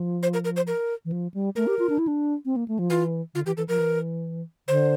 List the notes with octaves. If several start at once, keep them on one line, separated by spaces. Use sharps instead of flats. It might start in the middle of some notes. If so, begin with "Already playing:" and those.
Already playing: F3
C5
A#4
A#4
C5
A#4
E3
F3
G3
A3 A#4
G4
F4
D4
E4
D4
C4
A#3
A3
F3
E3 F4
D3 F4
E3 G4
E3 A4
F3 A#4
E3
D3 C5